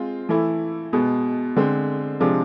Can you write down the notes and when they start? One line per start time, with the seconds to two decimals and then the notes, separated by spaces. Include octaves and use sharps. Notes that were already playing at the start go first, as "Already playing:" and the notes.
Already playing: G#3 C4 F4
0.29 E3 A3 E4
0.93 B2 G#3 B3
1.56 D3 G#3 C4
2.20 C3 F3 G#3 D4